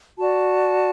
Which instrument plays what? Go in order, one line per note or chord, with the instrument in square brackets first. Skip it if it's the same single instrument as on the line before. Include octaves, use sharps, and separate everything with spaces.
[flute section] F#4 D5 A5